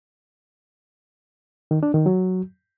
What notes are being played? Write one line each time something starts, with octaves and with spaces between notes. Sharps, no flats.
D#3
D4
D#3
F#3